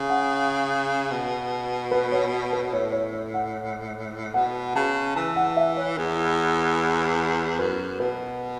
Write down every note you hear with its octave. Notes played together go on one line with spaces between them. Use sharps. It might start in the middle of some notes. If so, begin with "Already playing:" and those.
Already playing: C#3
F#5
B2
B4
C#5
B4
A2 C#5
C#5
C#5
F#5
B2 F#5
C#3 A5
E3 A5
F#5
E5
C#5
E2
F#2 B4
B2 B4